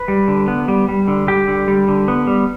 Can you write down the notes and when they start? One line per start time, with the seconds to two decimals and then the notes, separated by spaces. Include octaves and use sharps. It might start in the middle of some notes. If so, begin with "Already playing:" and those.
Already playing: B4
0.08 G3
0.28 D3
0.48 B3
0.68 G3
0.89 G3
1.08 D3
1.27 G3 G4
1.47 D3
1.68 G3
1.88 D3
2.08 B3
2.27 G3